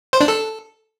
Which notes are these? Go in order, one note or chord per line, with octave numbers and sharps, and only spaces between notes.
C5
D4
A4